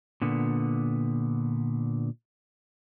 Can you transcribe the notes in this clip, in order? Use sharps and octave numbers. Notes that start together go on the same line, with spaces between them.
A#2 D3 B3